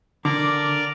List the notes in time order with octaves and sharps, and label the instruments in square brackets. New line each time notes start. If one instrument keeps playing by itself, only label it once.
[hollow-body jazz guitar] D3 [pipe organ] A#4 D5 A#5 [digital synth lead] D6